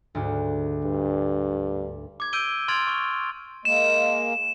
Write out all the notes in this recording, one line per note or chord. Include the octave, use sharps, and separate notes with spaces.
D2 G#2 F#4
G2
D6 G#6
E6 G6 D7 D#7 G7
C6 F6 G#6 A6 D7 F7
C#6
G#3 A#3 E7